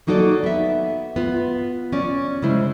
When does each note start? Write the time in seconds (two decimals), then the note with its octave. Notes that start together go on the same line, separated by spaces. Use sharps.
0.07 F#3 A#3 D#4 F#4 A4 D5
0.43 B3 E5
1.16 B3 F4
1.92 C#4 D5
2.42 C#3 G#3 E4 C5